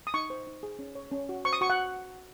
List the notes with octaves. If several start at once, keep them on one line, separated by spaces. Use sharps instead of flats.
D#6
D#4 C#6
C5
D#4
G#4
C#4
C#5
C#4
F#4
C5 C#6
D#6
F#4 C#6
F#5